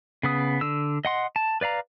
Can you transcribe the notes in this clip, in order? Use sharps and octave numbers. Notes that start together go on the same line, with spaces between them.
C#3 B3 D#6
D3 E6
D#5 F#5 C6
A5
B4 D5 F5 A#5